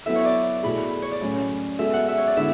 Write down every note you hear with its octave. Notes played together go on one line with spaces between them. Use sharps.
F#3 B3 E4 A4 E5
C#5
D5
B2 A3 E4 G#4 B5
C#5
D5
A2 F#3 C#4
G#3 B3 F#4 A4 E5
F#5
E5
C#5
D5
D3 G#3 B3 E4 E5